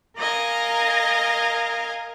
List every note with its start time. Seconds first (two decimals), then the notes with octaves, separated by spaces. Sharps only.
0.18 A#4 D#5 F5 G#5